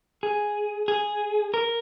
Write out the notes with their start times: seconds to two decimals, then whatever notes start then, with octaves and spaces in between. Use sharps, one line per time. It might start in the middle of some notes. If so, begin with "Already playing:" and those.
0.23 G#4
0.88 G#4
1.54 A#4